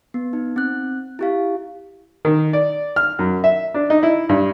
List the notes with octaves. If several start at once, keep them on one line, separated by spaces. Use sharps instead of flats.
B3
D#4
C4 F#6
E4 G4 F5
D#3
D5
F6
F#2
E5
D4
D#4
E4
G2